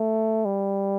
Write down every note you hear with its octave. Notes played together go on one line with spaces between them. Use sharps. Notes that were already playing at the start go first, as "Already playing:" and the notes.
Already playing: A3
G3